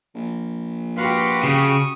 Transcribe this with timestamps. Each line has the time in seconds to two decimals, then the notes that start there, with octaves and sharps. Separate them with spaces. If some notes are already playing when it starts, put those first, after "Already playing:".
0.15 A#1
0.97 F#4 G4 B4 F5 C6
1.43 C#3 C#6 D#6